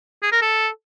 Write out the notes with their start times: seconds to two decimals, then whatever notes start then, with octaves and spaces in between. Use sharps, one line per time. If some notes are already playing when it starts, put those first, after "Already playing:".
0.23 G#4
0.32 A#4
0.42 A4